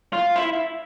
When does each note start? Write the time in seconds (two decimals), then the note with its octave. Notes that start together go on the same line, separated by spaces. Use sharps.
0.13 F4
0.37 E4